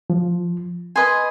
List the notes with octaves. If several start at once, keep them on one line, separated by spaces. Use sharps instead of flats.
F3
B4 D#5 G#5 C6